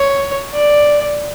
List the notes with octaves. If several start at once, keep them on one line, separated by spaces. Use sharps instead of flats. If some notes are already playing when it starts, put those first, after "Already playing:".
Already playing: C#5
D5